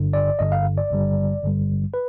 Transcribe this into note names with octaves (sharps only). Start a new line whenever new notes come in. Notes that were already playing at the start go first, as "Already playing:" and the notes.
Already playing: G1 G2 D3
D5
G1 G2 D3 D#5
F5
D5
G#1 G2 D3 G3
G#1 G2 D3 G3
B4